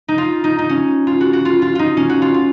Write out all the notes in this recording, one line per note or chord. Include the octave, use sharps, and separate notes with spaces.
D#4
F4
D#4
D#4
C#4
F4
F#4
F#4
F4
F4
D#4 F4
C#4
F#4
F4
F4